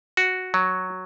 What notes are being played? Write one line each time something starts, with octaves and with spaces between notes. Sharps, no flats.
F#4
F#3